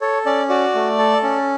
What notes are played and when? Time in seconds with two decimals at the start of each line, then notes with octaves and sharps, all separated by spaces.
0.01 A4 C#5
0.26 C#4 D5
0.49 F#4 D5
0.75 A3
0.98 A4
1.23 C#4